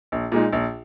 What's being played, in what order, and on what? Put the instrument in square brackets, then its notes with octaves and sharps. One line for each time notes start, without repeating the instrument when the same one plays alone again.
[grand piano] A#1
A#2 G#3 D#4
A#1